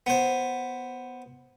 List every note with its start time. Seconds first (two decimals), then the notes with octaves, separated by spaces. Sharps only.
0.06 B3 C5